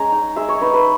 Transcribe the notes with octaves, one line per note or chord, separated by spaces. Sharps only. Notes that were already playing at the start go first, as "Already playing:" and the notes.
Already playing: G#3 C#4 A#5
D#4
G#3 E5
C#5
D#4 B4
B4